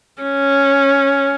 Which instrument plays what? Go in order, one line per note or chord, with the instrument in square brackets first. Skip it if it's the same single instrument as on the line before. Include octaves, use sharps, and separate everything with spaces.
[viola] C#4